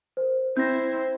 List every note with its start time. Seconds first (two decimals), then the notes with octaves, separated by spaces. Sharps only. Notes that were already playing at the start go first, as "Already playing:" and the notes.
0.17 A#4 C5
0.57 C4 E4 C5 G6 A#6